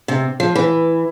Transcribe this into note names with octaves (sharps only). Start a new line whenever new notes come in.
C3
F3
E3